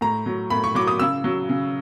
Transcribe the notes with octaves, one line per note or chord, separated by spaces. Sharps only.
A2 A#5
F#3
A2 B5
C#6
F#3 D6
D#6
C#3 E6
F#3
C#3